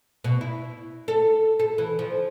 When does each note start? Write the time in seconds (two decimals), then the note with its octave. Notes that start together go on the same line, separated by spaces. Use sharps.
0.24 B2
0.41 E4
1.08 A4
1.59 A4
1.78 E3
1.99 F3